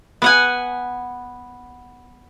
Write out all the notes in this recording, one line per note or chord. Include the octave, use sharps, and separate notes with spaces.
B3 F#5 G#5